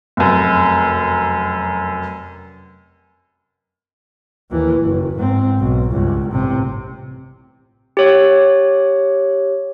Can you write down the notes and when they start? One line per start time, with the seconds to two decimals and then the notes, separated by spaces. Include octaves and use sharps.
0.17 F1 F#2
4.51 D#2 E3
4.81 F#1
5.17 G#2 C4
5.59 B1
5.91 C#2 G2
6.32 A1 C3
7.97 G4 C#5